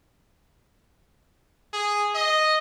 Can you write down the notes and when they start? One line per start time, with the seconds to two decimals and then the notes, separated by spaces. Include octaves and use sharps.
1.73 G#4
2.15 D#5